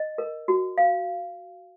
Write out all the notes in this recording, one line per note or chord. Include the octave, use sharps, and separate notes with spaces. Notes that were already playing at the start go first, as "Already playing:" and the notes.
Already playing: D#5
A#4
F#4
F5